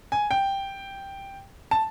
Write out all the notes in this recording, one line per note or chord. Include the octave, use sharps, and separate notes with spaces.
G#5
G5
A5